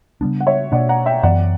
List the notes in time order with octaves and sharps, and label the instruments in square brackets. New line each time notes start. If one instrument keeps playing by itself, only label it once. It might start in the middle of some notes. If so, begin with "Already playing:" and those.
[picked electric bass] C#3 G3 B3 D4
[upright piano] F#5
C#5 E5
[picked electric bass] B2 A#3 D4 [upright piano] D5 F#5
[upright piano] F#5 A#5
E5 G5
[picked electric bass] F#2 E3 B3 [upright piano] D5 F#5